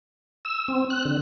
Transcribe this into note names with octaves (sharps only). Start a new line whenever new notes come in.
E6
C4
F#6
D3